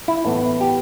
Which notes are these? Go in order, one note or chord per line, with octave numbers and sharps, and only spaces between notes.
E4
A2 E3 B3
G4